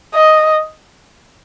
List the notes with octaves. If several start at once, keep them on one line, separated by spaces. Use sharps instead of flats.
D#5